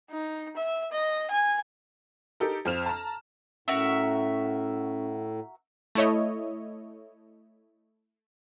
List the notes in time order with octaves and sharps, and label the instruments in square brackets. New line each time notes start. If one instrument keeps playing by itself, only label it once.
[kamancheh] D#4
E5
D#5
G#5
[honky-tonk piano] D#4 G4 A4 A#4
F2 C4 F6 E7 F7
A5 A#5
[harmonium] A2 [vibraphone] C#4 [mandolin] F#4 A#4 E5
[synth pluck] A3 E4 C#5 D#5